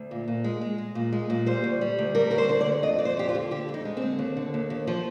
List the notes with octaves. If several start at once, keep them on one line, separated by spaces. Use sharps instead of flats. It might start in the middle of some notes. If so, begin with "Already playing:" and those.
Already playing: D2
A#2
A#2
G#3
G#3
G#3
A#2
G#3
A#2
G3 C5
D2
G3
D2
G3 A#4
D2 A#4
C5
D3
D5
D2
F2 D#5
F2 D5
C5
F2 G4
F4
D3
D3 G4
F2
D#4
G#3
C4
D3
D#2
D3
D#2
D#2
F3